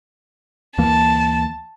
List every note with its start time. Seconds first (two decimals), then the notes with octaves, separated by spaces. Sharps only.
0.78 D2 E3 A#3 A5